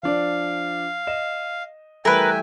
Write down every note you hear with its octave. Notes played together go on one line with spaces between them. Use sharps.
F3 D4 D5 F5
D#5 E7
E3 G3 A3 A#4 B4 E5 G5 G#5